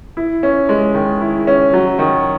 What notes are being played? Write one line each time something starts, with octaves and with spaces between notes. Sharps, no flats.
E4
C#4
G#3
D#3
E4
C#4
F#3
D#3